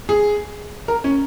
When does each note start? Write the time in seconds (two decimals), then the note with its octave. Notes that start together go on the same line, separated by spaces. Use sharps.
0.09 G#4
0.88 A#4
1.04 C#4